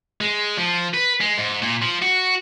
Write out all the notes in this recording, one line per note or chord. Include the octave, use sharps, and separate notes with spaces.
G#3
F3
B4
G#3
G#2
A#2
F3
F#4